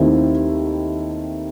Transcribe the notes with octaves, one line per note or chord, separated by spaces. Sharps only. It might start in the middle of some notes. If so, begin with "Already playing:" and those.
Already playing: D#2 D#3 A3 C4 E4